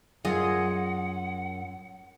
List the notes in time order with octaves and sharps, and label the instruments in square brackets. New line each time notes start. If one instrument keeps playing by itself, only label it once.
[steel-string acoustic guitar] F#2 [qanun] F4 G#4 D#5 [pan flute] F#5